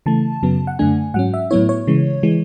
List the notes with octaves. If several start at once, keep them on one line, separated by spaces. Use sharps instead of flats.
C#3 E3 A3 A5
F#2 C#3 F#3 B3
F#5
F#2 D3 A3 D4 G#5
G#2 F#3 C#4 F#5
E5
A2 F#3 B3 E4 C#5
C#5
C#3 E3 G#3
E3 G#3